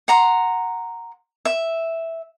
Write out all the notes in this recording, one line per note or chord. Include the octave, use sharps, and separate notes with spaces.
F#5 A#5 C6
E5